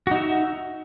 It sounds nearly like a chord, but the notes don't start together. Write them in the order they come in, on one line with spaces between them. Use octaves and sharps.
F#4 D#4 E5